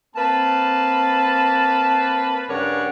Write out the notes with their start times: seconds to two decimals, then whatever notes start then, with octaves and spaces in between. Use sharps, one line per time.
0.16 A#3 C4 B4 A5
2.50 G2 C#3 A#4 C#5 D5 F#5